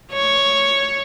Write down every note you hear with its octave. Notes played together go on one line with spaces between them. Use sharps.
C#5